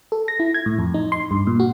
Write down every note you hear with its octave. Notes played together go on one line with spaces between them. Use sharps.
A4
A#6
E4
G#6
A2
F2
D#4
C6
G2
A#2
F#4